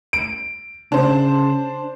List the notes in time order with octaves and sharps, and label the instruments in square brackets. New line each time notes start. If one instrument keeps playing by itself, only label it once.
[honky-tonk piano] D7
[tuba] C#3 [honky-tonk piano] D4 C5